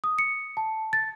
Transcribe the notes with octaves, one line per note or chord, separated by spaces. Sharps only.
D#6
C#7
A5
A6